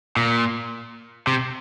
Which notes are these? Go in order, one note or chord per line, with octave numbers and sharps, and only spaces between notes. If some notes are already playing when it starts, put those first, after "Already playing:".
A#2
C3